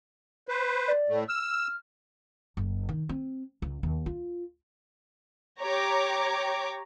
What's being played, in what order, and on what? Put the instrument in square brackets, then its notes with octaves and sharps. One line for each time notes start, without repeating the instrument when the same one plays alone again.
[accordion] B4 C5
[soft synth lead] D5
[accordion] A2 A3
[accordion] E6 [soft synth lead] F6
[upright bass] F#1
D#3
C4
C#2
D#2
F4
[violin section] G4 C#5 A#5 D6